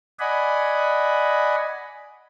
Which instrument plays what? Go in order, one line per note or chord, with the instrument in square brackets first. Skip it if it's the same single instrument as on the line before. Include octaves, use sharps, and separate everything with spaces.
[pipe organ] D5 D#5 F#5 G#5 B5